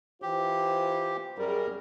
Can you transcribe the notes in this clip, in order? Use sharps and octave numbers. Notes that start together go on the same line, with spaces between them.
E3 F4 G4 C5
F#2 G3 G#4 A#4